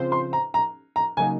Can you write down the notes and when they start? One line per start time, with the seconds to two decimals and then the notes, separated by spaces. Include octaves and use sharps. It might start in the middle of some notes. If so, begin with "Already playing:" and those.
Already playing: C#3 F3 C4 F4 C5
0.12 C6
0.33 A#5
0.54 A#5
0.96 A#5
1.17 C#3 F#3 A#3 D#4 G#5